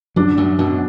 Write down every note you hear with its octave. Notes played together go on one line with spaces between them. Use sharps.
F#2 F#3 D4
F#2 F#3
F#2 B2 F#3